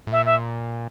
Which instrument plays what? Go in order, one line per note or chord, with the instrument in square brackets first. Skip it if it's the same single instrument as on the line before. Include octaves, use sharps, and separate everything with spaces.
[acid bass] A2
[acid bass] A#2 [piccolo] E5
[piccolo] E5